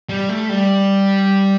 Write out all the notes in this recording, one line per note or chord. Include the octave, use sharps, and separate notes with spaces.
G3
A3
G3